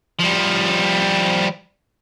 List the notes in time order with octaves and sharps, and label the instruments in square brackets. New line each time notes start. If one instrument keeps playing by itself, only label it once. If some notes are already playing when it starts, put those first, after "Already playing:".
[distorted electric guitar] F3 G3